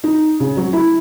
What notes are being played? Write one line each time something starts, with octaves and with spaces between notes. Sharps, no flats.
D#4
C#3
F#3
E4